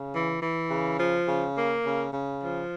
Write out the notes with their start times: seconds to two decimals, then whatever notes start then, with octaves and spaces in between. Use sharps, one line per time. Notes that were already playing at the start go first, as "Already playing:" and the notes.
Already playing: C#3
0.13 E3
0.41 E3
0.70 C#3
0.98 F3
1.27 C#3
1.56 A#3
1.85 C#3
2.13 C#3
2.42 F3